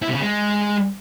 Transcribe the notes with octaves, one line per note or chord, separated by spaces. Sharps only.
E4
C3
C#3
G#3